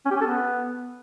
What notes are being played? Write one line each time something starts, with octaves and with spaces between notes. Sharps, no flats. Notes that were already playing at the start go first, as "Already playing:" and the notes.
C#4
G4
C#4
A4
B3